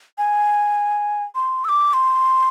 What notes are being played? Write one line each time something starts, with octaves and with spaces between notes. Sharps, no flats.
G#5
C6
E6
D6
C6